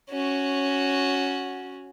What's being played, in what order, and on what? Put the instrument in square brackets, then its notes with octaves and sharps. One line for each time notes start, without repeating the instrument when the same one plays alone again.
[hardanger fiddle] C#4 F#4